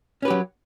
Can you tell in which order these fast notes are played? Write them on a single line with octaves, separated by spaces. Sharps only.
C#4 B4 G4 F#3